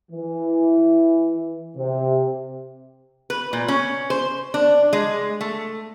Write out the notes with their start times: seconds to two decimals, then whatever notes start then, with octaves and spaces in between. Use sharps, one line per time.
0.11 E3
1.77 C3
3.30 B4
3.53 A#2
3.68 C#4
4.10 C5
4.54 D4
4.93 G#3
5.41 A3